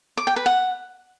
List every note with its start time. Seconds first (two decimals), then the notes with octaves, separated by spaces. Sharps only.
0.17 D6
0.27 G5
0.36 B4
0.46 F#5